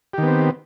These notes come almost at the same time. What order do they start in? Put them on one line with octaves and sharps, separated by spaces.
G4 D#3 B3 C4